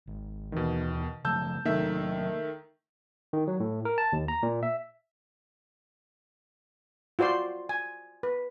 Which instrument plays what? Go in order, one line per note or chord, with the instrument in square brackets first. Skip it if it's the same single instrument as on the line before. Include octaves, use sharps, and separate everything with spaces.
[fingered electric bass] G#1
[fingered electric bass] D#2 E3 [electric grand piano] B2 D#3
[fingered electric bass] C#3 F3 A3 [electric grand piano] A5 E6 G6
[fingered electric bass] C3 F#3 A#3 [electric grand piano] D#3 A3 E5
[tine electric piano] D#3
F#3
A2
A#4
A5
D#2
A#5
A#2
E5
[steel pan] F4 F#4 C5 D5 C6
G#5
B4